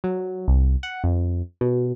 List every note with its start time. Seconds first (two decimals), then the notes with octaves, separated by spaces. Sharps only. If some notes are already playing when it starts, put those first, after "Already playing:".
0.04 F#3
0.48 C2
0.83 F#5
1.04 F2
1.61 B2